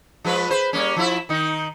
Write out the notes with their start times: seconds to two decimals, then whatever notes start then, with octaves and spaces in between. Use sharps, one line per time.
0.24 F3 G#3 B4
0.51 B4 C5
0.73 G3 A#3 C#4
0.96 F3 E4 E5
1.29 D#3 D#4